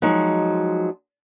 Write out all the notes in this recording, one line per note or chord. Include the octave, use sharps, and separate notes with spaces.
F3 F#3 G#3 D#4